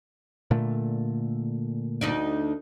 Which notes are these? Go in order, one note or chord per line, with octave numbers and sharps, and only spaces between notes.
A#2 D3 A3
D2 D#4 D5